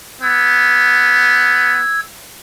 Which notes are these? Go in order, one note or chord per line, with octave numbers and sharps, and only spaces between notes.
B3 E6 G#6